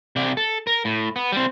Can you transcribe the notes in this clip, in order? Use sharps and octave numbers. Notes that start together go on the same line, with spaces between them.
C3 D5
A4
A#4
A2
B3
G3 C4